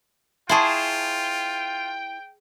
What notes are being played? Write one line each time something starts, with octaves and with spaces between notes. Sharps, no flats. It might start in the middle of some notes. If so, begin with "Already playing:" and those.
E4 F4 G#4 C5 G5 A5 C#6